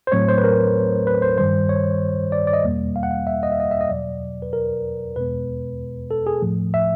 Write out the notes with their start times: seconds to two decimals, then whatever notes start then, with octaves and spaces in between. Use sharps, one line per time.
0.07 C5
0.12 A2 F#3 A3 C4 C#5
0.28 C5
0.38 B4
0.44 A#4
1.07 B4
1.22 C5
1.38 G2 D#3 G3 C5
1.69 C#5
2.32 D5
2.47 D5
2.53 D#5
2.64 E2 B2 G3 A#3
2.96 F5
3.03 F#5
3.11 F5
3.27 E5
3.43 D#5
3.52 E5
3.60 D#5
3.71 E5
3.81 D#5
3.90 E2 B2 F#3 D5
4.42 B4
4.53 A#4
5.16 E2 B2 G#3 B3 B4
6.11 A4
6.27 G#4
6.42 A2 F3 A3
6.74 E5